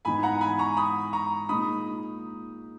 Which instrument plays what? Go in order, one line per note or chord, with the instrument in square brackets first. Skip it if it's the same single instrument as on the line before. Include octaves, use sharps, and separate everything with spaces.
[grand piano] G#2 E3 B3 D#4 [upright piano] G#5 B5
[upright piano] F#5 A#5
G#5 B5
A#5 C#6
B5 D#6
A#5 C#6
[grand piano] A#2 G#3 D#4 [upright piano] B5 D#6